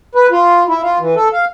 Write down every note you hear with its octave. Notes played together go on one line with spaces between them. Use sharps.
B4
F4
E4
F4
E3
A4
F5